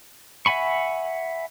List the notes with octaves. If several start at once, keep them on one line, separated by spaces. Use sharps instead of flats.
E5 F#5 G#5 B5 C#6